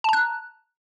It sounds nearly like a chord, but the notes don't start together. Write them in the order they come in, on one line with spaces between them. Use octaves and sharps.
A5 A#5 F#6